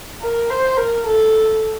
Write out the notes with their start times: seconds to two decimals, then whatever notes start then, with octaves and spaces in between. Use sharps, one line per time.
0.22 A#4
0.50 C5
0.77 A#4
1.07 A4